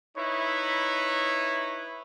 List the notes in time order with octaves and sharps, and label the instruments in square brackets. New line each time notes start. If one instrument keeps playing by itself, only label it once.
[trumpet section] D#4 E4 B4 C#5